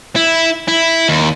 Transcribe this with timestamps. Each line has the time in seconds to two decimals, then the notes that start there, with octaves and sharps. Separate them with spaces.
0.16 E4
0.68 E4
1.09 D#2